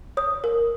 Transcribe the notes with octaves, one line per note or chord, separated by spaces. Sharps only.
C#5 D#6
A#4